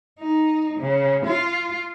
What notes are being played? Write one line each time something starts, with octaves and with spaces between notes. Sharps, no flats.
D#4
C#3
F4